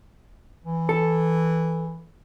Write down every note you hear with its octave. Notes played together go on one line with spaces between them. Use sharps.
E3
A4